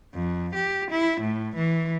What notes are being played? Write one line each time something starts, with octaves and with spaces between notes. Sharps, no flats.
F2
G4
E4
A2
E3